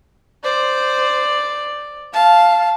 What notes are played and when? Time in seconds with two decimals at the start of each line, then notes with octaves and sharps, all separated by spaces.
0.44 C5 D5
2.13 F5 A5